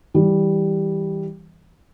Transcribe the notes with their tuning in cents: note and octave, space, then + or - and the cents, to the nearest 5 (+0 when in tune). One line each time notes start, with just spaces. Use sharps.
E3 -20 G3 +0